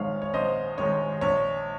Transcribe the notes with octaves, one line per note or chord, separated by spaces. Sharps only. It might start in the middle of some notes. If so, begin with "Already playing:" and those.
Already playing: A#1 G#2 D#3 G#3 C#5 F5
C#5
A#1 C5 D#5
G#2 D#3 G#3 C#5
A#1 C#5